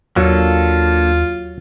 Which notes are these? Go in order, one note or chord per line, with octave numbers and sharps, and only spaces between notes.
D#2 F#3 A#3 D4 F4 A4